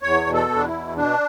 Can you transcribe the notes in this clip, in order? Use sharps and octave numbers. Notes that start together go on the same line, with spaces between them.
E2 C#5
B2
A4
E2
D4
E4
B2
B2 D4